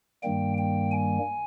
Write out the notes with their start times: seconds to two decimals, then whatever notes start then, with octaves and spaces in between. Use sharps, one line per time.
0.23 G2 D#3 G3 A#3 G5
0.58 G5
0.91 G#5